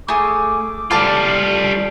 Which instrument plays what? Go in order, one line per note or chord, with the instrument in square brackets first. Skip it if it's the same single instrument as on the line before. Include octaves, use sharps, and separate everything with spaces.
[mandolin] A3 G#4 [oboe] D6
[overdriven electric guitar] G3 F4 [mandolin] A4 A5 F6